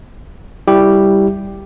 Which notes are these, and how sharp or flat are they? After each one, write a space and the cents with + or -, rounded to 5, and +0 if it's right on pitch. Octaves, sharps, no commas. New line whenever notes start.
G3 +0 E4 +0 G4 +0